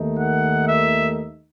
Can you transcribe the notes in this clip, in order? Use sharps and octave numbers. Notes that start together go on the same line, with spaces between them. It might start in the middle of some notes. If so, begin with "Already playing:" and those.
Already playing: D#2 D#3 A3 D#4
F#5
E5